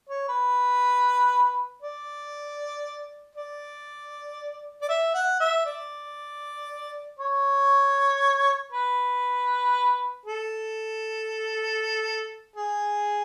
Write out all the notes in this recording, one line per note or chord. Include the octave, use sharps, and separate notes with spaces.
C#5
B4
D5
D5
D5
E5
F#5
E5
D5
C#5
B4
A4
G#4